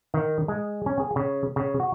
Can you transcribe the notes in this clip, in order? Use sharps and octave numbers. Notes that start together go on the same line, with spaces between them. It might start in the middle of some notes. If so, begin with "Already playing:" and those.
D#3
G#3
C#4
G#4
C#3
C#3
F#4